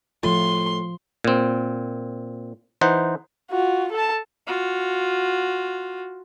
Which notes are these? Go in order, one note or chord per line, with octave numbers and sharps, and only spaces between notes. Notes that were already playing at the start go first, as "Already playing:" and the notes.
A2 F3 F4 C6
A#2 C4
E3 D#4 C5 F#5
F4 F#4
A4 A5
F4 F#4